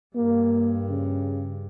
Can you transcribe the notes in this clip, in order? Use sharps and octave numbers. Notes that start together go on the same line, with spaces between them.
G2 A#3
C#3